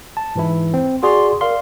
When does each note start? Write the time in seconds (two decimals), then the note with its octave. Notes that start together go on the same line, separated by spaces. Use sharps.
0.17 A5
0.36 G#2 E3 E4
0.74 C4
1.03 F#4 G#4 D5 C6
1.41 A#4 D5 F5 C6